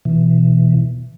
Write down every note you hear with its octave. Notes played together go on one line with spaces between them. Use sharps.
B2 E3